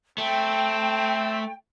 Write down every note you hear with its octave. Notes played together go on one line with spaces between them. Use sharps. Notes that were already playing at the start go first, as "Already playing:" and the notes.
A3 C4 G5